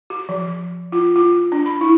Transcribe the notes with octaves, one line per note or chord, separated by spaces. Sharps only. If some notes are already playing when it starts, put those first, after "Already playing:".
F#4
F3
F4
F4
D4
B5
E4